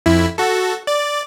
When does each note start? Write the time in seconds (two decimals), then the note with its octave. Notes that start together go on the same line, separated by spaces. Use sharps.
0.06 F2 E4
0.38 F#4 A4
0.87 D5